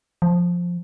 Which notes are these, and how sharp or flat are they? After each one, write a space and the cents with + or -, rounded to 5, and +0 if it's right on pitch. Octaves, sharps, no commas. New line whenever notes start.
F3 +5